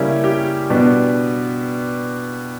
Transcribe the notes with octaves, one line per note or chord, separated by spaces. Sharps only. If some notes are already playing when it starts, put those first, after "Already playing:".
Already playing: C#3 G3 A#3 C#4 E4 G4
G4
B2 G3 B3 D4